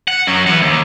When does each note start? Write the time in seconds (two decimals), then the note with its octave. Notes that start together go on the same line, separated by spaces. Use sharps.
0.08 F#5
0.27 F#2 F#3
0.46 E3 F#5
0.62 D#2